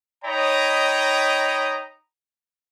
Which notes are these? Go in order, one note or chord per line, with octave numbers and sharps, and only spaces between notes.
D#4 C#5 D#5 G5 A#5 B5